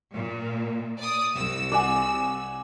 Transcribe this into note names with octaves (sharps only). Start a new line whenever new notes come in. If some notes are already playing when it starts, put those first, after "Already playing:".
A#2
D5 D#6
C2 E6
D5 F#5 G#5